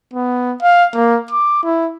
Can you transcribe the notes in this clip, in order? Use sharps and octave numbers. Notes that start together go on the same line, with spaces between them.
B3
F5
A#3
D6
E4